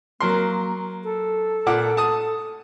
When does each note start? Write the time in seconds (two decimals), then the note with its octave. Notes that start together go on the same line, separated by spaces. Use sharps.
0.20 F#3 A#3 A#4 C6
1.04 A4
1.66 A#2 F#5 D6
1.97 A5 D#6